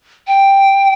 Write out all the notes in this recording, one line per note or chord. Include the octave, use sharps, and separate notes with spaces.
G5